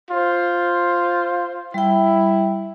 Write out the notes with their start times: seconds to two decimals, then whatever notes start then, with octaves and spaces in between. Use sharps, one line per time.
0.11 F4 C5
1.74 G3 E4 G5